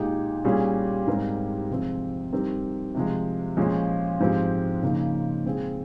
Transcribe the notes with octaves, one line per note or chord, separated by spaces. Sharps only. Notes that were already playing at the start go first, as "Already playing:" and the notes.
Already playing: A#2 G#3 D#4 G4
A#2 G3 C#4 G#4
G#2 G3 C4 G4 A#4
C3 F3 G#3 C4
G3 C4 D#4 G4 A#4
C3 F3 G#3
A#2 F3 G#3 C#4 G#4
G#2 F3 G#3 C4 G4
C#3 F3 A#3 D#4
A#2 G#3 C4 F4 G#4